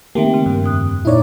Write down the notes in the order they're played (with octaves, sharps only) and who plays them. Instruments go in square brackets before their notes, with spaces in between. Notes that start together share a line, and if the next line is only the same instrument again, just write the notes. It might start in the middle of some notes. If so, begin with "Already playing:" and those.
[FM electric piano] D#3 A#3 [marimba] A3 C4 E5 [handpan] G4
[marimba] C#3 C4
[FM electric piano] G2
[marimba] F2 D#6 F#6
[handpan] A#2 D#4 D5 [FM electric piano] E4 C#5